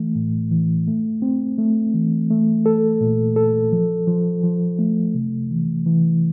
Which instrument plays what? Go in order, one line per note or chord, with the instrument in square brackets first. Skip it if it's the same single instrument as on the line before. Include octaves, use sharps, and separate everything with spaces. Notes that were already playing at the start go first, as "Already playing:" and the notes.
Already playing: [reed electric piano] E3 A3
A2
E3
A3
C4
A3
E3
A3
A4
A#2
A4
F3
F3
F3
A3
C3
E3
E3